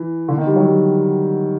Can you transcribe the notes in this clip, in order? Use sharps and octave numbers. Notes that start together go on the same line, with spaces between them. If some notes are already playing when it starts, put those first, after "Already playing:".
Already playing: E3
D3
D#3
G3
F#3
G3